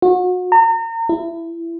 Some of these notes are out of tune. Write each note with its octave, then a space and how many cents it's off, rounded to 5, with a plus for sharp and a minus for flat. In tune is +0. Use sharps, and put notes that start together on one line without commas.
F#4 -30
A#5 -35
E4 +20